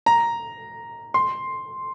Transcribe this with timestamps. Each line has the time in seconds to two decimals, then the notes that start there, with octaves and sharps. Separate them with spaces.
0.06 A#5
1.14 C6